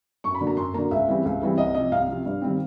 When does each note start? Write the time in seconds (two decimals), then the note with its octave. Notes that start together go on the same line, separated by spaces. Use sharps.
0.24 F#2 C#6
0.35 B5
0.41 D3 F#3 A#3
0.47 A#5
0.57 F#2 C6
0.74 D3 F#3 A#3 A#5
0.91 C#2 E5
1.08 C#3 E3 G3 C4
1.25 C#2
1.42 C#3 E3 G3 C4
1.58 C2 D#5
1.74 C3 F3 D#5
1.91 C2 F5
2.08 C3 F3
2.26 G2
2.42 D#3 G3 C4